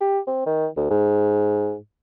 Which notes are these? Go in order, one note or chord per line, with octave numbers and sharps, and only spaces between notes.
G4
C4
D#3
D2
G#2